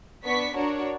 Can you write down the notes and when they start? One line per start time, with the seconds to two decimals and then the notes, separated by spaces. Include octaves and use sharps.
0.24 B3 D4 C#6 B6
0.55 D4 F#4 A#4 C#5